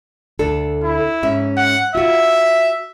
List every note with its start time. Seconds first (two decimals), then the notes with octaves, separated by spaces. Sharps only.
0.39 D2 D4 A4
0.83 E4
1.23 G#2 C#4 E5
1.57 F#5
1.95 F4 F#4 E5